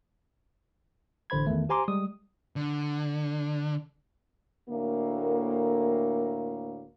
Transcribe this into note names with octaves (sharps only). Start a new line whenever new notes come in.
A1 D3 C5 B5 G#6
E2 D#3 A3
G4 C5 G#5 A#5 C6 D6
G3 G#3 D#6
D3
D2 A2 A#3